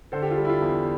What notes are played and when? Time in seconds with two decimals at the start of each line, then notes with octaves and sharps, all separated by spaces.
0.12 D3 A4 C5
0.22 G4
0.31 F4
0.37 G3
0.45 E4
0.49 F4
0.62 E2